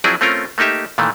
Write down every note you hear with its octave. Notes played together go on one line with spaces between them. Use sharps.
F3 F#3 C4 E4 G#4 D5
A3 C4 C#4 F4 A#4
A3 A#3 D#4 G4 E5
A#2 D#3 E3 A3